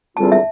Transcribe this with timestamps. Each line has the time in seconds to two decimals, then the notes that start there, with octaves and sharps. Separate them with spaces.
0.17 E2 D3 G3 C4 F4 A5
0.32 E5